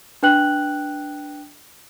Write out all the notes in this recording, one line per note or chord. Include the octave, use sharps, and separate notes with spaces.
D4 B4 G5 F#6 F#7